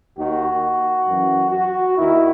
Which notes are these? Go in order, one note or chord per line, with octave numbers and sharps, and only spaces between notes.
D#2 D#3 F#4
F#2 E3
F#4
D#2 D#3 E4